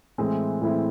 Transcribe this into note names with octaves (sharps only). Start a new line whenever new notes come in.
A2 E3 G#3 C4 E4
A2 E3 G#3 C4 E4